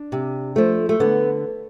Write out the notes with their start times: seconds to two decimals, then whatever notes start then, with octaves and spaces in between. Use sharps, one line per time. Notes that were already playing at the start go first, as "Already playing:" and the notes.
Already playing: D4
0.12 C3
0.56 F3 A3
0.89 A3
1.00 D3 B3